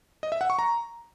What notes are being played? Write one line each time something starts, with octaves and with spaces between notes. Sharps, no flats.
D#5
E5
F#5
C#6
A#5